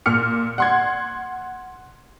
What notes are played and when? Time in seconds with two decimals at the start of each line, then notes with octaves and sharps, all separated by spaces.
0.06 A#2 F6 C#7
0.58 F#5 C6 G#6